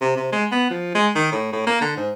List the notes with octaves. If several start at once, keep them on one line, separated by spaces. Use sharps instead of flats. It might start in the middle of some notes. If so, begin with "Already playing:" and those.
C3
C3
G#3
B3
F3
G#3
D#3
A2
A2
A#3
D3
G#2